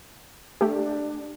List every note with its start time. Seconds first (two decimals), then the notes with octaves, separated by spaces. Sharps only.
0.61 A3 D4 G4